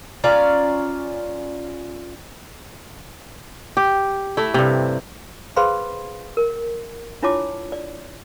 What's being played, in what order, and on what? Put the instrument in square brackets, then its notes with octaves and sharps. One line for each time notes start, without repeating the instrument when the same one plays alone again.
[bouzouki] C#4 F4 D5 A#5
[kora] G4
A3 E4
G2 C3
[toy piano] G#4 B4 C5 F5 B5 C6
A#4
D4 E4 F4 C#5 A5 D6
D5